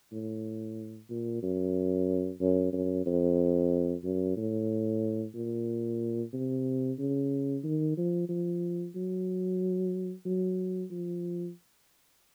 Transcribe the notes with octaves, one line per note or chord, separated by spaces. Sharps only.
A2
A#2
F#2
F#2
F#2
F2
F#2
A2
A#2
C3
C#3
D#3
F3
F3
F#3
F#3
F3